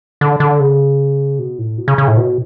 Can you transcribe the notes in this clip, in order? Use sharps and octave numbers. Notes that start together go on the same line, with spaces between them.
D3
D3
C#3
B2
A2
B2
C#3
C#3
A2
B2